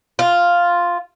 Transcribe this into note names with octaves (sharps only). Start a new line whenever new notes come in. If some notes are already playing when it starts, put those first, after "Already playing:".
F4